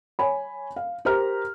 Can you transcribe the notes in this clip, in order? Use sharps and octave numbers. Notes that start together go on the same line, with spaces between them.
C#5 G#5 B5
F5
G4 A#4 C5 A#5 F6